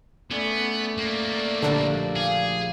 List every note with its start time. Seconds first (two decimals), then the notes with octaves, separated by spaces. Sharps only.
0.31 A3 B3 C#4 D5
0.98 A#3 B3
1.63 A#1 A#2 D3 D4 G4
2.16 G#4 F5 D6